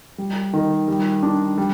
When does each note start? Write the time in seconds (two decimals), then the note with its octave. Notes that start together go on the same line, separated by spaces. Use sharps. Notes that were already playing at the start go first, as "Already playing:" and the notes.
0.18 G3
0.53 D#3
0.88 G3
1.23 D4
1.58 G3